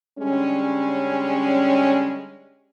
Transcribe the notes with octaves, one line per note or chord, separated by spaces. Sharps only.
D3 G3 G#3 C#4